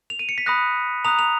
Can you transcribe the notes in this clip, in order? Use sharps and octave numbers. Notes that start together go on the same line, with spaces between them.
F7
D#7
C#7
B6
B5 D#6 F#6 A#6
A#5 D#6 F#6 F7
F7